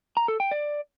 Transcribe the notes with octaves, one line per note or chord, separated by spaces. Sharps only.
A#5
A4
G5
D5